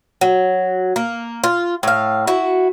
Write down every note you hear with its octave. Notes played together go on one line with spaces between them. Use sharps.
F#3
A#3
F4
A2 F5
E4 F#4